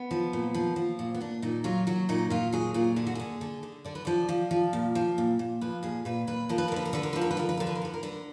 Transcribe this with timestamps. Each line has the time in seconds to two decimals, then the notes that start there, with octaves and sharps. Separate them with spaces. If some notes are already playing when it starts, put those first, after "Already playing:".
Already playing: B3
0.11 F3
0.33 A#2
0.54 F3
0.76 F3
0.99 A#2
1.14 B3
1.21 A#2 D4
1.42 A#2 D#4
1.64 F#3 F4
1.87 F#3 F#4
2.09 A#2 D#4
2.30 A#2 F4
2.53 F#3 G#4
2.74 A#2 F4
2.96 D3 G#4
3.07 F#4
3.15 D3 G#4
3.41 D3
3.63 D3
3.84 D3 D5
3.95 B4
4.05 F3 D5
4.29 F3
4.51 F3
4.73 A#2
4.95 F3
5.18 A#2
5.39 A#2
5.61 F3 B4
5.83 A#2 G#4
6.05 A#2 B4
6.27 A#2 B4
6.49 F3 A#4
6.58 B4
6.68 A#4
6.72 D3 B4
6.85 A#4
6.93 D3 B4
7.03 A#4
7.13 F3 B4
7.21 A#4
7.31 B4
7.37 F3 A#4
7.49 B4
7.57 D3 A#4
7.67 B4
7.75 A#4
7.82 D3 B4
7.94 A#4
8.03 D3 B4
8.12 A#4